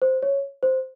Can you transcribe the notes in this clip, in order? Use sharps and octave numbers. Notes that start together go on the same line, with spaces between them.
C5
C#5
C5